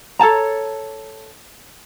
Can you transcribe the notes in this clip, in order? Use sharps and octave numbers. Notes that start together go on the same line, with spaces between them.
A4 C#5 A5 A#5